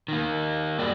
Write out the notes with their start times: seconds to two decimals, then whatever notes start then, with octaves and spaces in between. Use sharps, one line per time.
0.08 D#3 A#3
0.78 F#2 G3 G#4 D5